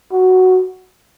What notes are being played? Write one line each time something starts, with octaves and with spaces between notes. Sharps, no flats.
F#4